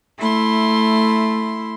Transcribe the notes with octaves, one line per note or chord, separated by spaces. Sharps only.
A3 E4 C6